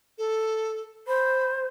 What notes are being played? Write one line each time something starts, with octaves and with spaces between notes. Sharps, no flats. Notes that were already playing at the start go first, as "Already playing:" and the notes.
A4
C5 B5